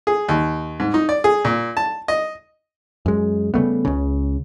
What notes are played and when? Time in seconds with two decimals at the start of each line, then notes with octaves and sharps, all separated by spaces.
0.07 G#4
0.28 D#2
0.80 G#2
0.94 D#4
1.09 D5
1.24 G#4
1.45 A#2
1.77 A5
2.08 D#5
3.06 F#2 G#3
3.54 C#3 G3 A3 B3
3.85 C#2 C#3